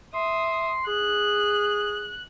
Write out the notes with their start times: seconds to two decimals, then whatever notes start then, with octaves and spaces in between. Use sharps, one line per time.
0.14 E5 C6 D#6
0.87 G#4 F#6